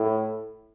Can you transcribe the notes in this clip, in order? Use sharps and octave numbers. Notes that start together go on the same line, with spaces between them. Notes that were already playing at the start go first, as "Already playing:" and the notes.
Already playing: A2